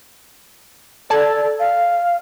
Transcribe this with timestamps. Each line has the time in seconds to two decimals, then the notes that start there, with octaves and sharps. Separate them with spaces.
1.10 A4 D5 A5 G#6
1.60 F5